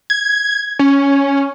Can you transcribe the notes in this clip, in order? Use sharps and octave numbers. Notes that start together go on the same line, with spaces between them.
G#6
C#4